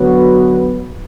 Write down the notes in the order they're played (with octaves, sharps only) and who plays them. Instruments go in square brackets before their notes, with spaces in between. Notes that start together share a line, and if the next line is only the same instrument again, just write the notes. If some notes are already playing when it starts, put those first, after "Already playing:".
Already playing: [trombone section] D3 F#3 B3 F#4 B4